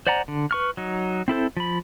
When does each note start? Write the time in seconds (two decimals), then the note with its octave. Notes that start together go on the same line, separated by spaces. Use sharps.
0.07 C5 D5 F#5 G#5 A#5
0.28 D3
0.51 B4 C#6 F6
0.77 F#3 D#4
1.28 C4 E4 A4 C5
1.57 F3 B5